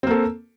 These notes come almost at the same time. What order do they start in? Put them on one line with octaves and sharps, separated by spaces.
C4 A#3 A4